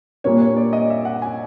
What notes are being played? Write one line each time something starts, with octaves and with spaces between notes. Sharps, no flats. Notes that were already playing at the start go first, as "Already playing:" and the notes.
A#2 G3 A#3 D4 C#5
C#5
D5
D#5
E5
F#5
G#5